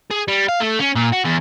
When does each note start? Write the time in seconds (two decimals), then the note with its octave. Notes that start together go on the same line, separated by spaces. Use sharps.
0.11 G#4
0.28 G3
0.49 F5
0.60 A3
0.79 C#4
0.95 A#2
1.12 F#4
1.24 E2